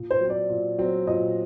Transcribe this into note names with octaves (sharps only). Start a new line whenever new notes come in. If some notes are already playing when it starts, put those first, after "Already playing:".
Already playing: A#2
C5
F#3 C4
D5
A#2
F#3 C4
A#2 D#5